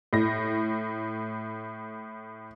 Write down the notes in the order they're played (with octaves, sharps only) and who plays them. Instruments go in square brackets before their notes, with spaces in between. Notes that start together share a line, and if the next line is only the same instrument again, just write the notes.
[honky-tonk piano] A2 A#6